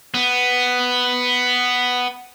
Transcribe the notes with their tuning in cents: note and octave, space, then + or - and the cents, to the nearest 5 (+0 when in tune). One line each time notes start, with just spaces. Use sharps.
B3 +5